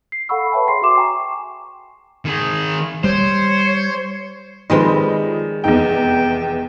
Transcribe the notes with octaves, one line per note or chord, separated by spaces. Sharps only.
C7
A4 F5 F#5 B5 C#6 E6
B4 C#5 E5 G5 A5
G#4 G5 C6 C7
F#4 E5 C6 D6 E7
G5 G#5 A#5 C#6 D6
D#3 G#4
G3 C5 C#5
D#3 F3 G3 G#3 C4 B4 D#5
F1 E2 D#4 G5